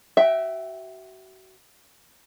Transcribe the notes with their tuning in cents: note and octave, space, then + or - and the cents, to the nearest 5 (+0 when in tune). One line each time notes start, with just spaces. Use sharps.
F#4 +35 E5 +0 G5 +0